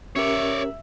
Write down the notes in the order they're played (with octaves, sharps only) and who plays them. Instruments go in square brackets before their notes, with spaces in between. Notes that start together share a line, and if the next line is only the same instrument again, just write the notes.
[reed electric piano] C#4 G4 A#4 [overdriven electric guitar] C#5 D5 [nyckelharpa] E5